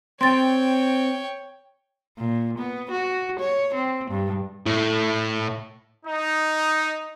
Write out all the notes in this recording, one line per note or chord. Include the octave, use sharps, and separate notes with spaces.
C4 C#5 G5 C6 A6
A#2
B3
F#4
C#5
C4
G2
A2
D#4